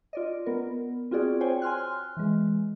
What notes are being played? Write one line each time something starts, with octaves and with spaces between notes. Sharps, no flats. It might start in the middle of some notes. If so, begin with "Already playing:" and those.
F4 D5 D#5
B3 A#4
C4 F4 F#4 G#4 D5
C5 C#5 G5 G#5
G#5 C6 F6 F#6
E3 G#3